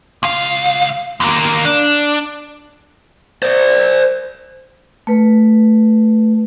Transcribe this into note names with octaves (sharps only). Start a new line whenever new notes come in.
C#2 F5
D#2 A#3
D4
C5 D5
A3 B4